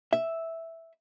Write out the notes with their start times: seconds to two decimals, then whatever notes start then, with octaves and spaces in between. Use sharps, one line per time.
0.13 E5